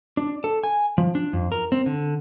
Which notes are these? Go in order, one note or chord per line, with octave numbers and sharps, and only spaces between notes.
D4
A4
G#5
F3
D4
F2
A#4
C4
D3